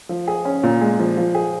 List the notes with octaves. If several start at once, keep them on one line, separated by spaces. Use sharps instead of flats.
F3
G#4
C#4
A#2
G#3
F3
F3
G#4